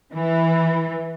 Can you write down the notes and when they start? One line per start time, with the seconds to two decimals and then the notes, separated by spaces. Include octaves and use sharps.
0.13 E3